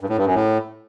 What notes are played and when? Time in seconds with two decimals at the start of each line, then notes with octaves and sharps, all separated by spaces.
0.01 G2
0.09 A2
0.18 G2
0.26 F#2
0.35 A2